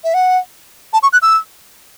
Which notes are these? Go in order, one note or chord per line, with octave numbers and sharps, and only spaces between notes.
E5
F#5
A5
C#6
F#6
E6